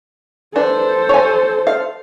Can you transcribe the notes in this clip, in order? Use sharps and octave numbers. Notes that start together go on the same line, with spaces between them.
D4 A4 B4 C5
C#5 G#5
F5